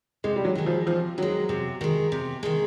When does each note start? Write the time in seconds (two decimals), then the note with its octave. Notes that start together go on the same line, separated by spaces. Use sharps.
0.24 C3 G#3
0.36 G3
0.45 F#3
0.55 D#3 G#3
0.66 F3
0.87 C3 F3
1.18 D#3 F#3 G#3
1.49 C3
1.81 D#3 G#3
2.12 C3
2.43 D#3 G#3